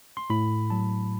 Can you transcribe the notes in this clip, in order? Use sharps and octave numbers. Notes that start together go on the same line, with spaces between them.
C6
A2 B5
F#3 A5